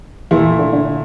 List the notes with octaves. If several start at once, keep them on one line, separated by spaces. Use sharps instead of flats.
E2 A#2 E3 A3 E4
D3
D3